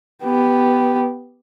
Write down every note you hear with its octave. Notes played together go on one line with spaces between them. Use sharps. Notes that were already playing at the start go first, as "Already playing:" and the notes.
B3 G4